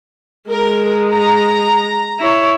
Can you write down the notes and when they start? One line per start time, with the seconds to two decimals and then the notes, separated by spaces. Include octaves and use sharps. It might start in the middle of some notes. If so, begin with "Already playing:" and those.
0.50 G#3 A#4
1.11 A#5
2.19 E4 C#5